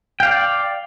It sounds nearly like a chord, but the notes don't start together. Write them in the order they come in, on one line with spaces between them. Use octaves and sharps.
G5 F5 D5